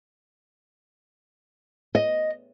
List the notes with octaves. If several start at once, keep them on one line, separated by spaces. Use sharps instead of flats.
D#5